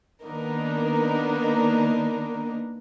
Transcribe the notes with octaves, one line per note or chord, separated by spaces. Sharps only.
D#3 A#3 B3 D4 D#4 A#4